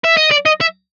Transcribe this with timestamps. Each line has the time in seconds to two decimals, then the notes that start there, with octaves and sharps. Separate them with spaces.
0.04 E5
0.17 D#5
0.31 D5
0.45 D#5
0.61 E5